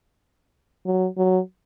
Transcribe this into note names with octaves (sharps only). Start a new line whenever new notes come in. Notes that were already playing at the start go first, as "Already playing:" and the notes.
F#3
F#3